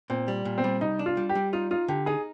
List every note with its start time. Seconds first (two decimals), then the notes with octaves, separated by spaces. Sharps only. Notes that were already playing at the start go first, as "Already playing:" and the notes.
0.10 A#2 C4
0.28 G3
0.45 A#2
0.58 C4
0.64 G3
0.81 C2 D#4
0.99 D4
1.06 F4
1.17 G3
1.29 G4
1.35 G3
1.53 D#4 F4
1.71 D#4 F4
1.88 D3 G4
2.06 D#4 G#4